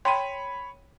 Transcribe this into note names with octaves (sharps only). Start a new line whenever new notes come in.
C#5 G5 B5 C6 D#7